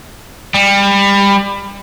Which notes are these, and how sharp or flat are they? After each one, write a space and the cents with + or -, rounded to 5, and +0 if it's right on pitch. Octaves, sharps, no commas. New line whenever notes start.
G3 +25